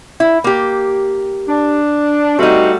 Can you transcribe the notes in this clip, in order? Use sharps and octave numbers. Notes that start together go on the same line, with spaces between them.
E4
A#3 G4
D4
G3 A3 C4 D#4 F#4